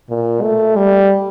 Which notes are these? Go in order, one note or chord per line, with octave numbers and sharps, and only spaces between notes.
A#2
A3
G3